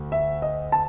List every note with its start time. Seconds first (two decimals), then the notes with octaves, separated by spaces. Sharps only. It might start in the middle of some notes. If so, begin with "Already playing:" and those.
Already playing: D2
0.12 E5
0.42 D#5
0.72 A5